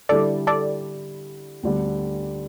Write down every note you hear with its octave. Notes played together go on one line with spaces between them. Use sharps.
D3 G3 E4 A4 D5
A4 D5
D2 D3 G3 D4